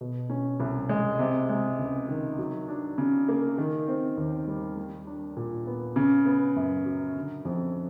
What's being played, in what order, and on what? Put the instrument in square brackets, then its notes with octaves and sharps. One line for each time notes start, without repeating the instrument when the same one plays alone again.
[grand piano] B2
C#4
C2
G#3
C3
G#3
C#2
D#3
F#3
D4
C#3
A#3
D#3
C4
D#2
G3
G3
D4
A#2
B3
C#3
B3
F#2
F#3
D3
F2